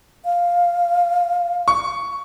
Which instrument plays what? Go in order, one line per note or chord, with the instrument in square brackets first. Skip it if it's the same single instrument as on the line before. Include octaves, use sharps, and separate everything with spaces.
[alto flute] F5
[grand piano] C#6